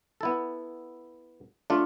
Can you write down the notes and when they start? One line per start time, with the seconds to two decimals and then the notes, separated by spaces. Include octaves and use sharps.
0.21 B3 E4 A4
1.70 A3 D4 F4